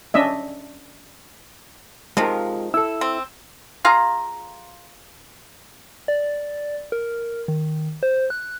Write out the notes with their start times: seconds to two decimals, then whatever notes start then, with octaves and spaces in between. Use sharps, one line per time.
0.14 C#4 D4 D#5 E5
2.17 C3 D#3 F3 G#3 F4 A#4
2.74 E4 A4 E6
3.01 C4
3.85 F4 G#4 F5 A#5
6.08 D5
6.92 A#4
7.48 D#3
8.03 C5
8.30 F#6